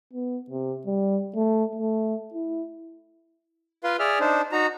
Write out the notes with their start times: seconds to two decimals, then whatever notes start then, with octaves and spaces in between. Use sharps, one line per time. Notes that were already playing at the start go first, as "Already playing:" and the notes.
0.13 B3
0.50 C3
0.86 G3
1.36 A3
1.76 A3
2.34 E4
3.84 F4 B4 F5 C6
3.99 G#4 D5 E5 F6
4.20 D4 D#4 C5
4.52 D#4 F#4 A#5